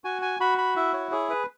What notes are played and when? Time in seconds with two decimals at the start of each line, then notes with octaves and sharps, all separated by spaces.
0.04 F#4 G#5
0.22 G#5
0.40 F#4 B5
0.58 B5
0.76 E4 E5
0.93 C#5
1.12 G#4 C#5
1.30 B4